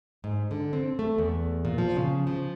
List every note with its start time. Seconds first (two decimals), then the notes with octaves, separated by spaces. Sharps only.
0.24 G#2
0.51 D3
0.73 C4
0.99 A3
1.18 E2
1.65 A#2
1.78 F3
1.96 C#3
2.27 F3